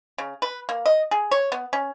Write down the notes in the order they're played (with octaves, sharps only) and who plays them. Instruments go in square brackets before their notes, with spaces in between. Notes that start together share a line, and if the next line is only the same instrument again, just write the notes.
[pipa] C#3
B4
A#3
D#5
G#4
C#5
B3
C#4